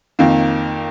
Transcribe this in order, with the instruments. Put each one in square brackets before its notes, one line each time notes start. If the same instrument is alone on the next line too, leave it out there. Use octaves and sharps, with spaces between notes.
[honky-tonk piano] F2 D#3 A#3